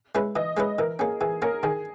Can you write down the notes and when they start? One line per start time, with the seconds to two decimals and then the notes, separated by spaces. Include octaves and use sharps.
0.15 G#3 C#4 E4 B4
0.35 E3 D#5
0.57 G#3 C#4 E4 B4
0.79 E3 A#4
0.99 A#3 C#4 G#4
1.21 E3 G#4
1.42 A#3 C#4 A#4
1.63 D#3 G#4